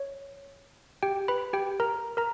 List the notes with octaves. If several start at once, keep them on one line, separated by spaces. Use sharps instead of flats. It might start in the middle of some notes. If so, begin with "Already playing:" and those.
Already playing: C#5
G4 G5
B4 B5
G4 G5
A#4 A#5
A#4 A#5